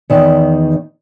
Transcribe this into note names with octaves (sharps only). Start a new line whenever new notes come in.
E2 D#3